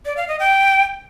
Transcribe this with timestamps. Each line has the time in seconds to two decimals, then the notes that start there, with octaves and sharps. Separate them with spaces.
0.05 D5
0.17 F5
0.28 D#5
0.40 G5